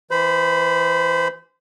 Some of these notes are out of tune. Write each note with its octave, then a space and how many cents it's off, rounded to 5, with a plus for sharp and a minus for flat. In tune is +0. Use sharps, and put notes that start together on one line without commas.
E3 +0 C5 -25 B5 +0